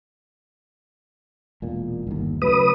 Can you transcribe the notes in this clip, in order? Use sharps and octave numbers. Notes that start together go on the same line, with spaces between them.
E1 A#2
G1 D#2
C#3 F#3 A3 B4 D#6